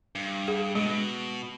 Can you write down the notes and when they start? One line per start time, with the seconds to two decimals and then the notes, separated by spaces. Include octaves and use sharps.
0.15 G2
0.48 G#4
0.75 B2 G#3